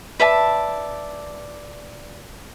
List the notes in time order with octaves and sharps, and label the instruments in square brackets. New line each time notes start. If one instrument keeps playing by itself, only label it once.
[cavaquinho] B4 D5 E5 A5